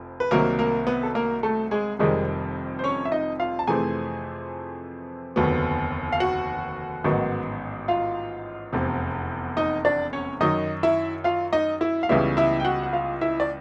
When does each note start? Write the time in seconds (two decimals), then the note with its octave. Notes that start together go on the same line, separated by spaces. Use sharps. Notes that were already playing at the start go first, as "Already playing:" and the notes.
Already playing: F1 F2
0.20 B4
0.31 C2 C3 D#3 F#3 A#3 A#4
0.59 A#3 A#4
0.87 B3 B4
1.03 A4
1.15 A#3 A#4
1.43 A3 A4
1.71 G#3 G#4
1.99 F1 F2 C3 D#3 G3 G#3 G#4
2.79 C5
2.84 C#4 C#5
3.05 E5
3.12 D#4 D#5
3.40 F4 F5
3.59 A5
3.67 F2 C3 E3 A3 C4 G#4 G#5
5.36 F1 D#2 D3 F#3 B3
6.12 F5
6.20 F#4 F#5
7.04 A1 G#2 D#3 F#3 B3
7.88 F4 F5
8.73 F1 E2 C3
9.57 D#4 D#5
9.85 D4 D5
10.13 C#4 C#5
10.40 F#2 D#3 F#3 D#4 D#5
10.83 E4 E5
11.24 F4 F5
11.53 D#4 D#5
11.81 E4 E5
12.03 F5
12.09 C#2 C#3 E3 G3 B3 E4 E5
12.37 E4 E5
12.60 G5
12.65 F#4 F#5
12.83 F#5
12.93 F4 F5
13.21 E4 E5
13.40 D5